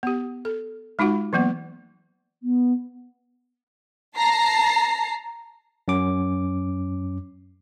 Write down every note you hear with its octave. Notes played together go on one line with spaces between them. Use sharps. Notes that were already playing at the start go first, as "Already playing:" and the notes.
B3 G4
A4
G#3 D#4 F4 F#4 F#5
E3 F#3 A#3 B3
B3
A5 A#5 C7
F#2 C#4 D6